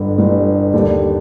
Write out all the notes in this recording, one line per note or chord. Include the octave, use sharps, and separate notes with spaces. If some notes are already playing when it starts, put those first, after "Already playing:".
Already playing: G1 G2 D3
G1 G2 D3
D#2 D3 G3 D4 G4